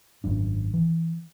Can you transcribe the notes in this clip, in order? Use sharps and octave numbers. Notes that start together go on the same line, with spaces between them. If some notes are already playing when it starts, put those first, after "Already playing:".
G#1 F#2 D4
E3